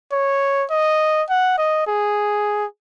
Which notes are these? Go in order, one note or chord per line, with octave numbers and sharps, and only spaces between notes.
C#5
D#5
F#5
D#5
G#4